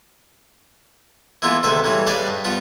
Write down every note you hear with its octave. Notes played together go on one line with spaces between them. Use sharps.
E3 G#3 A#3 B3 E4 F4
D2 C3 D#3 B4 E5
C#3 E3 G3 A3
G3 D4 B4 D5 D#5 F5
G2
F3 G3 B3 F4